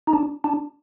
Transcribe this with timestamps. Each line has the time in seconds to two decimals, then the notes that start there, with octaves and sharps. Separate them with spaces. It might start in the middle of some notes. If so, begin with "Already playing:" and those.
0.07 D#4
0.13 D4
0.44 D4